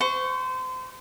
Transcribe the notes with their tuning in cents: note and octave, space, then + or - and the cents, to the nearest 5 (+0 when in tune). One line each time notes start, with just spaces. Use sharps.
C5 -30 C#6 +0